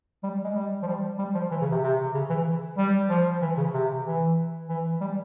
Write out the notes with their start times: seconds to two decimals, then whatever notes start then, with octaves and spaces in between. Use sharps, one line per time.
0.23 G3
0.44 G#3
0.55 G3
0.82 F3
0.87 G3
1.18 G3
1.34 F3
1.51 E3
1.61 C#3
1.71 C3
1.83 C3
2.14 C#3
2.30 E3
2.77 G3
3.09 F3
3.42 E3
3.57 C#3
3.73 C3
4.05 E3
4.69 E3
5.00 G3